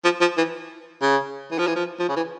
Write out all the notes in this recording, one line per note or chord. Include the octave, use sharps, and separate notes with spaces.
F3
F3
E3
C#3
E3
F3
E3
F3
F3
C#3
E3